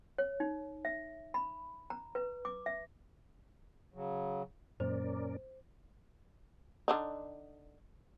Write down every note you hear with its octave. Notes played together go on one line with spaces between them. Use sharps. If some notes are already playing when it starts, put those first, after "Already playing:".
C#5
D#4
E5
B5
A#5
B4
D6
E5
C#3 F#3
F#2 A#2 C#4 A#4 C5 D5
D3 D4 D#4